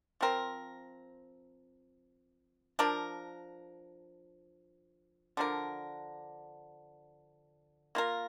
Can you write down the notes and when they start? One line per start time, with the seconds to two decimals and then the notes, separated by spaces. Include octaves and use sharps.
0.21 F3 C4 A#4
2.79 F3 D4 A#4
5.37 D3 F3 D4 A#4
7.95 A#3 F4 A#4